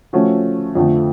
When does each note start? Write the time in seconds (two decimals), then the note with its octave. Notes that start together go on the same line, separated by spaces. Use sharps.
0.13 F3 A3 C#4 F#4
0.75 F2 D3 F3 A3